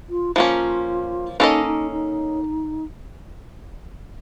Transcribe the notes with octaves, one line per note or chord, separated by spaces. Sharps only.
F4
F3 A#3 C#4 F4
A#3 C#4 D#4 A4 C5 D#5
D#4
D#4